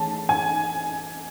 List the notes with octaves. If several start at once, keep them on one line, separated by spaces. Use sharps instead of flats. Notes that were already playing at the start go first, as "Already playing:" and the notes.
Already playing: E3 A3 C#4 G#4 A5
G#5